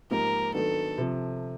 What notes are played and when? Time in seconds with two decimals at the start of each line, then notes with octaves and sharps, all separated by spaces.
0.11 G#2 F3 A#3 D#4 G4 A#4
0.54 D#3 F#3 B3 D4 A4
0.98 C3 F3